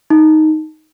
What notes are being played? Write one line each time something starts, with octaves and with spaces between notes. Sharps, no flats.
D#4